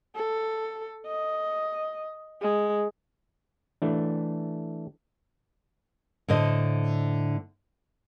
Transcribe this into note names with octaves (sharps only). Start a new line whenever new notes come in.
A4
D#5
G#3
E3 A3 D4
A2 D3 C5 D#5